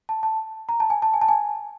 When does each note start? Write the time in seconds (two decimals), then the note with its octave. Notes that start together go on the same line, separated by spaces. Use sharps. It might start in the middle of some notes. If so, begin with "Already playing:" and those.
0.09 A5
0.23 A5
0.69 A#5
0.80 A5
0.90 G#5
1.02 A5
1.14 G#5
1.21 A5
1.29 G#5